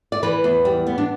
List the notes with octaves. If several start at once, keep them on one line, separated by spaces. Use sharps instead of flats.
D5
E3 B4
E2
G3
B3
D4